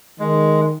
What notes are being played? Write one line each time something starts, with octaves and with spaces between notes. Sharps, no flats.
D#3 G#3